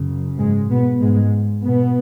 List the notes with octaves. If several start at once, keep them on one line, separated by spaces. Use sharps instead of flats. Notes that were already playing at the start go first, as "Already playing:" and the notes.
Already playing: F#2 C#3
G#2 G#3
B2 B3
G#2 G#3
B2 B3